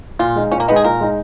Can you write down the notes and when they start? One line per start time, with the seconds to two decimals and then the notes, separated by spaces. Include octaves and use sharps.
0.19 A#2 F4
0.36 G#3 D#4
0.52 A#2 C#4
0.60 A#3
0.68 B3 D#4
0.71 G#3 G#4
0.84 A#2 A#4
1.00 G#3 D#4